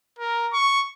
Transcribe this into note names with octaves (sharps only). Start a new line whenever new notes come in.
A#4
C#6